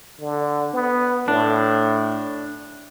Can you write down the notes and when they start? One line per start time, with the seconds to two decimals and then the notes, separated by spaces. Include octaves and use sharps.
0.20 D3
0.73 B3
1.28 A2 D4